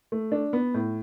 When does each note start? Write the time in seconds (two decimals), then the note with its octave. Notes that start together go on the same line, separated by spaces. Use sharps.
0.12 A3
0.32 D4
0.53 B3
0.74 A2